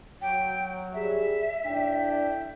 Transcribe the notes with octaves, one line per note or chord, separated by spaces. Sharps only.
F#3 G5
G3 G4 G#4 E5
A2 D4 G5